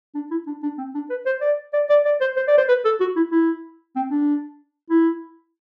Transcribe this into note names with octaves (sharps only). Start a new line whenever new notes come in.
D4
E4
D4
D4
C4
D4
B4
C5
D5
D5
D5
D5
C5
C5
D5
C5
B4
A4
F#4
E4
E4
C4
D4
E4